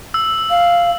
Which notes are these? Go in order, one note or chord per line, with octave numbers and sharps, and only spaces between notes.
E6
F5